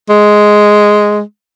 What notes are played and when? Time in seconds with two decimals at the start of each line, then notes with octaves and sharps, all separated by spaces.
0.09 G#3